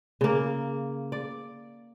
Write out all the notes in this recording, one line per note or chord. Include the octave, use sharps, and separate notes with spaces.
C#3 A#3
D5